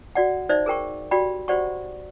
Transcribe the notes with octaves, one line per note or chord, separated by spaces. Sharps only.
F#4 D5 F#5
D#4 C5 D5 E5
G#4 A#4 G5 C#6
F#4 G4 D5 G5 B5
F#4 G4 C5 D5 F#5 C#6